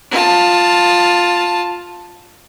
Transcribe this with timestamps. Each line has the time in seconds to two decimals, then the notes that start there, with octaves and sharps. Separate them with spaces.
0.11 F4 A5